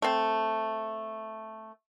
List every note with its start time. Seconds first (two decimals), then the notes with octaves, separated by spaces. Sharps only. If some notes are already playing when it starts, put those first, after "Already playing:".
0.02 A3 C4